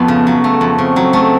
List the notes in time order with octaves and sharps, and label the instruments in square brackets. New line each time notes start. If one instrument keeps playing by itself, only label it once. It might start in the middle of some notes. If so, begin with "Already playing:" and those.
Already playing: [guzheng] F2 A3 [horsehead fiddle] B3
[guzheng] C#3
F#3
A3
F2
[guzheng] C#3 [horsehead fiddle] C4
[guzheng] F#3
A3